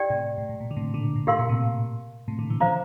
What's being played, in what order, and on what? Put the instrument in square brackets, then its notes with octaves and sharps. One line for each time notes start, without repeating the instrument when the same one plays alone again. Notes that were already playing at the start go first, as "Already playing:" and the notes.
Already playing: [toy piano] G4 D5 G5
[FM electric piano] A2 C3
A2
A2
A#2
D3
A2 C3
A#2 D3
A2
[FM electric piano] A2 [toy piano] G4 A#4 F5 C6
[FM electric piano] A#2
A2 C3
A2 C3
A#2 D3
C3 E3
[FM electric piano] D3 F3 [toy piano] C5 F5 A#5